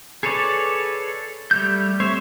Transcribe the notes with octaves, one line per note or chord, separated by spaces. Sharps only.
G#4 A4 B4 C#5 D5
G3 A3 G6
C4 C5 C#5 E5